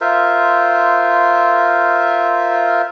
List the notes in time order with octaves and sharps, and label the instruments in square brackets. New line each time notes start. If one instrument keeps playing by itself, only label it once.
[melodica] F4 A#4 C5 E5